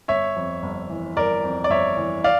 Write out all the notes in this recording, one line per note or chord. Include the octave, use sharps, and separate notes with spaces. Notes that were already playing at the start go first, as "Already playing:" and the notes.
G1 C#5 E5
F2
G1
E3
G1 A#4 D5
F2
D5
G1 C#5 E5
E3
D5 F5